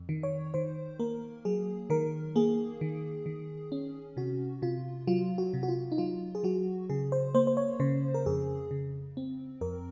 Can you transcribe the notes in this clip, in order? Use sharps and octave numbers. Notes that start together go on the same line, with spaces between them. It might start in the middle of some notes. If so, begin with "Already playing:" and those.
Already playing: F2
D#3
C#5
D#3 C5
A#3 A#4
F#3 G#4
D#3 A#4
A#3 G#4
D#3
D#3
C#4
C3 F#4
C3 F4
F#3 F4
F#4
C3
F#4
F4
D#4
F#3 F4
G#4
F#3 F#4
C#3 G#4
C5
A#3 C5
C5
C#5
C#3 C5
A#4
F2 G#4
C#3
C4
F2 A#4